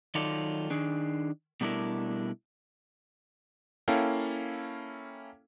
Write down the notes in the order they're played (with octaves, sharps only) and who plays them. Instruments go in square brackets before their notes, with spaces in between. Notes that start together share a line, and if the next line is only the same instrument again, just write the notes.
[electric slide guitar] D#3 F#3 D#4 F4 A4 D5
D#3 D4 G#4
B2 G3 A3 D4 E4 A#4
[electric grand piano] A#3 C#4 E4 A4 F5 G5